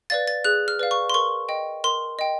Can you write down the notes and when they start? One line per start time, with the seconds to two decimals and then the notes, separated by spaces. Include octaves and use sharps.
0.10 B4 D5 F5 A6
0.27 A6
0.44 G#4 F#6
0.68 F6
0.79 B4 D5 F5
0.91 C#6
1.10 C6
1.14 A#4 C#6
1.49 D#5 G5
1.84 A#4 C6
2.19 D#5 G5